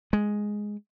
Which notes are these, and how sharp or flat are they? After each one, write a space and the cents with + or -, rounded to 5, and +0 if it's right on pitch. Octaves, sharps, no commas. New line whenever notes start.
G#3 +0